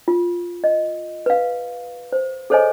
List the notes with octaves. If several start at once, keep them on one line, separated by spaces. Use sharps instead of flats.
F4
D#5
B4 F5
C5
G#4 A4 C5 C#5 D#5 G#5